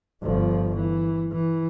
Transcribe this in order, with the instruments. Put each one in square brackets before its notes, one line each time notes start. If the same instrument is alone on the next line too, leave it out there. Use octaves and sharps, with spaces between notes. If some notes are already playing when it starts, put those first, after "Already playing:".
[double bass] G1 F3
E3
E3